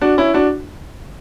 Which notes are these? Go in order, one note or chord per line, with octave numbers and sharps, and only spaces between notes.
D4 F#4
C#4 E4
D4 F#4